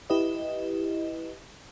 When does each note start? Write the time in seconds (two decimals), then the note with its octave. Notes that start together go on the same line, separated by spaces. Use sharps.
0.10 E4 G4 B4 D#5